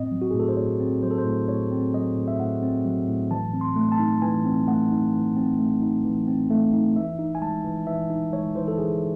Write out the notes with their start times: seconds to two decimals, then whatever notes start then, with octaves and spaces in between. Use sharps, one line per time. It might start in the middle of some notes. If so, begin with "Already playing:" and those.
Already playing: A2 C4 D#5
0.12 F#3
0.22 F#4
0.31 G#4
0.34 A2
0.40 A4
0.49 C5
0.57 A2 C#5
0.80 C4
1.03 F#3 C5
1.11 A4
1.18 C5
1.25 A2
1.48 A2 C#5
1.71 C4
1.94 F#3 D#5
2.16 A2
2.28 E5
2.40 A2 F#5
2.63 C4
2.85 F#3
3.07 A2
3.31 E3 A5
3.54 C4
3.61 C6
3.76 A3
3.92 A5
3.99 D#4
4.22 E3 G#5
4.45 C4
4.68 A3 F#5
4.91 D#4
5.13 E3
5.36 C4
5.59 A3
5.82 D#4
6.05 E3
6.27 C4
6.50 A3
6.73 D#4
6.96 E3 E5
7.19 D#4
7.35 G#5
7.42 G#3 A5
7.64 E3
7.87 E3 E5
8.10 D#4
8.32 G#3 C#5
8.55 E3 C5
8.68 A4
8.78 E3 G#4